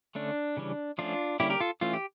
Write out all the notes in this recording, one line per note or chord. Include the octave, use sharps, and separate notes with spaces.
D3 A3 C#4 D4
C#3 E3 G3 C#4
F3 A3 C#4 D4 F4
D3 G3 A#3 C#4 E4 G4
G4 A#4
F4 A4
E3 A3 C#4 F4
G4